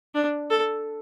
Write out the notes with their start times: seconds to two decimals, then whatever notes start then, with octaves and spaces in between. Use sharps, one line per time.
0.15 D4
0.50 A4